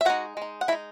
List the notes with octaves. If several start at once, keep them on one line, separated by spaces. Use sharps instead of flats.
E5
G#3 D#4 F#4 F#5
G#3 D#4
F#5
G#3 D#4 E4 E5